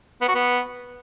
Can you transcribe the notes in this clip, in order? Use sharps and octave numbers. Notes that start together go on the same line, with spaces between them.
B3
F#4
B3